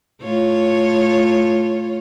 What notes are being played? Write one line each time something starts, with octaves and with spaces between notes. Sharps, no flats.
A2 F4 C#5